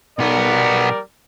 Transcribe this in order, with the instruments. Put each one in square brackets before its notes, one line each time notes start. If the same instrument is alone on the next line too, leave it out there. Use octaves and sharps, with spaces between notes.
[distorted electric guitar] B1 B3 [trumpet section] G3 A#4 D5